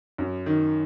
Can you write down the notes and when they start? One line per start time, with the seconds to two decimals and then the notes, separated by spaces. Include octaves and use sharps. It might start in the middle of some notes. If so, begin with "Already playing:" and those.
0.18 F#2
0.46 D#3